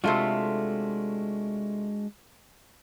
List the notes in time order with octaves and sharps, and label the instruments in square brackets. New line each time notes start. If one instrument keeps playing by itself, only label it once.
[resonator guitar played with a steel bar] C3 A3 F4 [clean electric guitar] G#3 D4 F#4